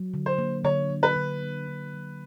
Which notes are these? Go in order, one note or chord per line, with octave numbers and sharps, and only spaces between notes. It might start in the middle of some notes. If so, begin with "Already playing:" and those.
Already playing: F#3
D3
C5
A#3
D3 C#5
F#3
B4
D3
A#3
D3
F#3